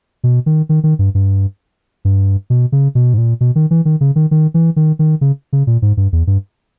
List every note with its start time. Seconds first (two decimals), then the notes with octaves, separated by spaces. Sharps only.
0.24 B2
0.46 D#3
0.69 D#3
0.83 D#3
0.99 G2
1.15 G2
2.05 G2
2.50 B2
2.72 C#3
2.95 B2
3.14 G#2
3.18 A#2
3.41 B2
3.56 D#3
3.71 E3
3.85 D#3
4.01 C#3
4.16 D#3
4.31 D#3
4.54 E3
4.76 D#3
4.99 D#3
5.21 C#3
5.53 C#3
5.67 A#2
5.82 G#2
5.97 G2
6.12 E2
6.27 G2